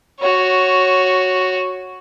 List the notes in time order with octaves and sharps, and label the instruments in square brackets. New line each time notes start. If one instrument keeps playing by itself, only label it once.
[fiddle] F#4 C#5